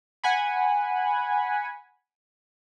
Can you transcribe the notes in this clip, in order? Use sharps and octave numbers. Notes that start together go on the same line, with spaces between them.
F#5 G#5 B5